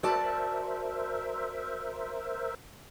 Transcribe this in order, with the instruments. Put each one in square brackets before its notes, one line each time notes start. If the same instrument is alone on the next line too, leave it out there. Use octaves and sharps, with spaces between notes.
[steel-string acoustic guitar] F#4 D5 A5 [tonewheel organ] A#4 C5 E5